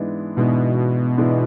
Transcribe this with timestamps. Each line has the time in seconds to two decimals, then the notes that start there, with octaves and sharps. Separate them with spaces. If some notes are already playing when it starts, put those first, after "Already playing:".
Already playing: G#2 E3 G#3 B3 D4
0.36 G#2 B2 E3 G#3 B3 D4
1.17 G#2 E3 G#3 B3 D4